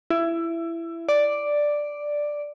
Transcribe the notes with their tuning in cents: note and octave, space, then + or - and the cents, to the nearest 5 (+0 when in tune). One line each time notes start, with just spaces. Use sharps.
E4 +20
D5 +0